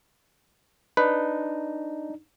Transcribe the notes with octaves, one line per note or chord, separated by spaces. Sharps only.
D4 D#4 B4